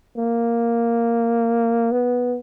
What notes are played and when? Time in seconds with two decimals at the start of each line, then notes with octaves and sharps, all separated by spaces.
0.17 A#3
1.92 B3